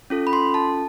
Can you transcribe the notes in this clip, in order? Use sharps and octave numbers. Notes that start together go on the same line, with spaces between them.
C#4 F4 A4
B5
C6
A5